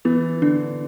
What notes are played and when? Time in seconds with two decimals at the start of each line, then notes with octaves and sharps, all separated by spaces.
0.05 E3 B3
0.42 D3 D4